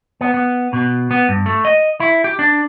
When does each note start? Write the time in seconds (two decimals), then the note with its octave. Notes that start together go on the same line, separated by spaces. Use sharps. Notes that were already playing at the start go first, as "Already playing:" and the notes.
0.21 B3
0.34 B3
0.73 B2
1.11 B3
1.29 G2
1.46 A3
1.65 D#5
2.00 E4
2.24 G4
2.39 D4